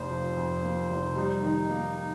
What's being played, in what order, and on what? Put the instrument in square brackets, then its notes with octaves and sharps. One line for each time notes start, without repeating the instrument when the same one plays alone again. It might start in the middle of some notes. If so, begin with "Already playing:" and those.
Already playing: [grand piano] F1 F2 A#3 [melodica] C5
[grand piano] F3
F2
A#3
F1
[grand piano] G3 [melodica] D#4
[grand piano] D#3
A#3